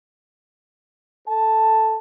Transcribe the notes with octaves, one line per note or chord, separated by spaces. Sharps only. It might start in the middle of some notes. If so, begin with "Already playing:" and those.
A4 A5